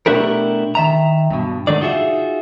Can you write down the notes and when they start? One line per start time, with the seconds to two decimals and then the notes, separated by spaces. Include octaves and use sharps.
0.06 B2 A3 D4 E4 G4 A#4
0.75 D#3 E5 A#5
1.30 G2 B2
1.67 G#2 D3 D#3 A3 D4 D5
1.81 D#4 F4 F#4 G#4 E5